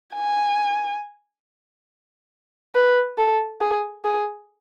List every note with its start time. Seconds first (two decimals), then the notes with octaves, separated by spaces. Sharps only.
0.14 G#5
2.75 B4
3.18 A4
3.61 G#4
4.04 G#4